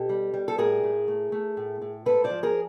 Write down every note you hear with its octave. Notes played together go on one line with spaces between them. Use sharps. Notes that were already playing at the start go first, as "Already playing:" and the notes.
Already playing: B2 G4 A4
G3
G3
A4
A2 G#4 A#4
A2
A3
A3
A2
A2
G#2 A4 B4
C5 D5
F3
G#4 A#4